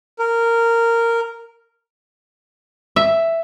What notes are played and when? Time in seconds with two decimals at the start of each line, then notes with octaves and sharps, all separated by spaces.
0.19 A#4
2.96 E5